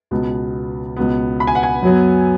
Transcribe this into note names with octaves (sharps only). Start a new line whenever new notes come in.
C#2 B2 B3
C#2 B2 B3
B5
G#5
F#5
G#5
F#2 F#3 B3